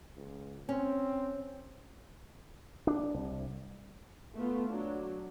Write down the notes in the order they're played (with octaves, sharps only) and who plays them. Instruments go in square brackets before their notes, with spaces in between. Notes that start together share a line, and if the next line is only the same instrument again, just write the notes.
[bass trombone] C#2
[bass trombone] C4 [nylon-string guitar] C#4
[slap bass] D4
C2
[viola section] A3 B3 F4
F#3 D4